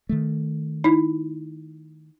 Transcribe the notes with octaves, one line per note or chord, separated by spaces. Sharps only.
D#3 A3
D#4 E4